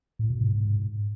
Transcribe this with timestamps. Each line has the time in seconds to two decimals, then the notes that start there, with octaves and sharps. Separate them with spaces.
0.19 A2
0.30 B2
0.41 G#2